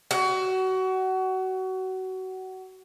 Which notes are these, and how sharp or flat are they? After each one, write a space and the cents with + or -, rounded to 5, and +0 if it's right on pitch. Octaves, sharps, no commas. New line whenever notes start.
F#4 +25